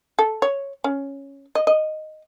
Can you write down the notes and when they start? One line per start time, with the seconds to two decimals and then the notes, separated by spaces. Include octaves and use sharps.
0.19 A4
0.42 C#5
0.84 C#4
1.55 D#5
1.67 D#5